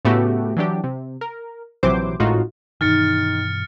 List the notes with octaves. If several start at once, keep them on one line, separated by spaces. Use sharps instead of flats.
A2 C#3 A3 B3 F#4 G4
E3 F#3 D4 G4
C3
A#4
A#1 C3 E3 F#3 C5 D6
G#1 A2 D#4 F4 F#4
G2 B2 D#3 E3 F6 A6 C#7